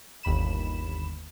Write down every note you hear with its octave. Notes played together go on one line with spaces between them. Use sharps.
G1 D#2 B5 E7